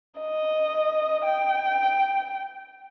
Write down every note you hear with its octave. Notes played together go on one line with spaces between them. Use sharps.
D#5
G5